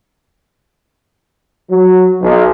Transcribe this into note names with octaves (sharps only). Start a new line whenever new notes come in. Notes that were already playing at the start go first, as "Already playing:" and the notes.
F#3
B1